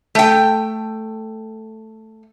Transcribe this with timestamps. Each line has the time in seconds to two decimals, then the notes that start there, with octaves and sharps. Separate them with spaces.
0.15 A3 G5